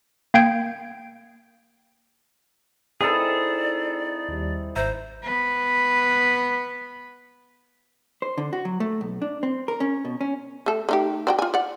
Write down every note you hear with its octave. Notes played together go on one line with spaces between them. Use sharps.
A#3 F5 G5 G6 G#6 D7
C4 D#4 E4 G#4 A4 D5
D#2 G3
G#1 C5 E5 A#5
B3 B4
C5
D3
F#4
F#3
A3
B1
D4
C4
A#4
C#4
B2
C#4
A3 A4
A3 D#4 G4
C4 F#4 G5
F4 G#5
D5 F#5